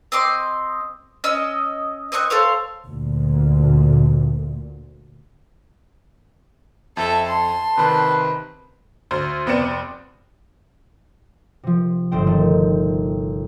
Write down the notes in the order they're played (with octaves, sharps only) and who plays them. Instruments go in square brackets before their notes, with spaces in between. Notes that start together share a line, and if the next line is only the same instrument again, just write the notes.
[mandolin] C4 D#5 C6 D6
C#4 D#5 E6
C4 D#5 C#6 F#6
A4 C5 C#5 F5
[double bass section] D2 A#2
[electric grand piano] F2 [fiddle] A4 E5 [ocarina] A5
[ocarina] A5 [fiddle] C6
[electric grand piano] C3 D#3 F#6 [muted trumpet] B4
[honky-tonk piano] D2 C5
F1 B3 C4 D5 C#7 E7
[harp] C3 F3
G1 C5 G5
D#3 A3